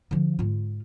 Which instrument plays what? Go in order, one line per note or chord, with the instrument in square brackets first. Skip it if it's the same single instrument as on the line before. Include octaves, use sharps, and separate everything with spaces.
[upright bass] D3 F3
G#2 F4